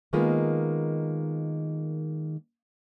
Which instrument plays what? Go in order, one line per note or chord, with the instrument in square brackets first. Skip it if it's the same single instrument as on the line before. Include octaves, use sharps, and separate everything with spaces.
[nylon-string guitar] D#3 G#3 A#3 B3 F4